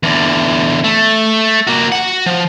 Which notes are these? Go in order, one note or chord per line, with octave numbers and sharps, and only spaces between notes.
E2 D3
A3
A#3 F#4
F#4 F#5
F3